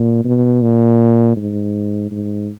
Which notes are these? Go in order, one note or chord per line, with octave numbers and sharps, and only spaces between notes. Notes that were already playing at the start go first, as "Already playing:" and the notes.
Already playing: A#2
B2
A#2
G#2
G#2